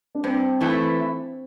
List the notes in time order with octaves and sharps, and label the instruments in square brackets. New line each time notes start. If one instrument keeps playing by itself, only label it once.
[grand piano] D4
[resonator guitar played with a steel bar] G2 [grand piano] C4
[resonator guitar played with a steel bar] E3 A3 E4 B4